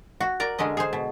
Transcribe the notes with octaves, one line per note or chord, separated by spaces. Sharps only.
F#4
A#4 D5 A#5
D3 G#3 C#4 D#5
G#4 C5
B2